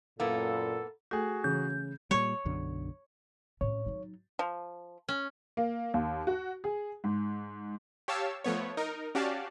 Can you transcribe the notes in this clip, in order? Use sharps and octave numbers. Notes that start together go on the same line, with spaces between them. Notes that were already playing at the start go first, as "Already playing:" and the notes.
F#2 A#2 A#3 B3 E4 A4
A3 F#4 G#4 A4
C#3 E3 G6
A#2 G3 C#5
B1 F#2 D3
A2 C#4 C#5
F#3 D#4
F3
C#4
A#3
D#2
F#4
G#4
G#2
G4 C#5 F5 A5 E6
F3 A3 B3 C#5
D#4 A#4
C#4 F#4 G4 D5 F5 A5